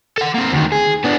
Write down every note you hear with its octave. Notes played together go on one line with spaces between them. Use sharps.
A4 F#5
A#3 C4
D2 D#3
G#4
B3 D4